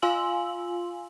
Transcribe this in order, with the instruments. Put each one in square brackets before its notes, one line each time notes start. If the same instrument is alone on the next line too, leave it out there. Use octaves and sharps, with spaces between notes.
[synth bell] F4 F5 G#5 C6 E6 F#7